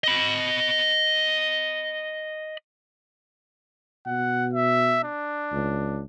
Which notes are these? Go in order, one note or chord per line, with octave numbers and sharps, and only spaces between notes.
D#5 B5
B2 F#5
E5
D4
C#2